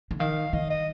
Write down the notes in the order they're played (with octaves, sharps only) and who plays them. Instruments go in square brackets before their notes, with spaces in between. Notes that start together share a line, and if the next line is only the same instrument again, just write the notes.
[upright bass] D3
[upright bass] D#3 [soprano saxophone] F5
[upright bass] D#3 [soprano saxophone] D#5
[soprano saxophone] D#5